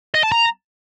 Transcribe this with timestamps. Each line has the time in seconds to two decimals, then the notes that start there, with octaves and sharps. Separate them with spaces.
0.14 D#5
0.23 A5
0.32 A#5